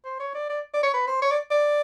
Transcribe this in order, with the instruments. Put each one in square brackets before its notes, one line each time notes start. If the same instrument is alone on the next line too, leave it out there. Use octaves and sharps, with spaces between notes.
[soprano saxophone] C5
C#5
D5
D5
D5
C#5
B4
C5
C#5
D5
D5